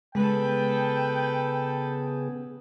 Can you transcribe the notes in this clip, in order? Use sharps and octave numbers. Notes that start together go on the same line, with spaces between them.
C#3 G#3 B3 G#4 A4 B4 G5